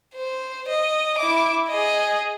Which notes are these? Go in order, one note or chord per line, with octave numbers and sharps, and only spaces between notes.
C5
D#5
E4 D6
G#4 D#5